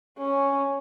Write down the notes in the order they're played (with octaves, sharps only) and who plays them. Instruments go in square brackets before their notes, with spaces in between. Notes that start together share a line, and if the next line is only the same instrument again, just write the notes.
[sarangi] C#4